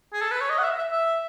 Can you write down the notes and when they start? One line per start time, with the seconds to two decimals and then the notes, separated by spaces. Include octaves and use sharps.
0.13 G#4
0.22 A4
0.31 B4
0.40 C#5
0.50 D#5
0.58 F#5
0.64 E5
0.77 E5
0.92 E5